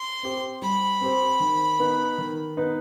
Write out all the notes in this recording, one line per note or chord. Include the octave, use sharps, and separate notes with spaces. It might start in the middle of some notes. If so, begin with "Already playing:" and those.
Already playing: C6
C4 G4 C5
G3 B5
C4 G4 C5
D#3
B3 D#4 B4
D#3
B3 D#4 B4